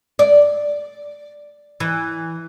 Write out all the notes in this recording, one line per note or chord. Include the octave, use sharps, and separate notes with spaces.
D5
E3